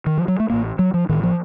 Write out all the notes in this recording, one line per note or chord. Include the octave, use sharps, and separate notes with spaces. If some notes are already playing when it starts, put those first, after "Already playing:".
D#3
F3
F#3
A3
A1 A2 A#3
F#3
F3
A1 A2 D#3
F3